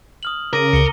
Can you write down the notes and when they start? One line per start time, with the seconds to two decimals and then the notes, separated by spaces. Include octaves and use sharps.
0.23 D#6 F6 F#7
0.53 C#3 A#4 D6 A#6 D#7
0.73 C#2 C#7 G7